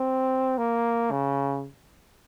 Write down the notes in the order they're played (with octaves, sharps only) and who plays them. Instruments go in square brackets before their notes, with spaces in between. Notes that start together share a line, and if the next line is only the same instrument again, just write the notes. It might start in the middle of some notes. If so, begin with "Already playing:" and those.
Already playing: [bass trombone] C4
A#3
C#3